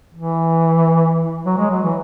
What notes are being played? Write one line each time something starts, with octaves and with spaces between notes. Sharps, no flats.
E3
F#3
G#3
F#3
E3